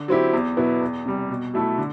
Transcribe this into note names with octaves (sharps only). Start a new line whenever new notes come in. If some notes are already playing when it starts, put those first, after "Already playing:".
Already playing: D3
F#3 C4 E4 G4
E2
B2 F#3 B3 E4
E2
C3 G3
B2
F#3 A3 E4 A4
D3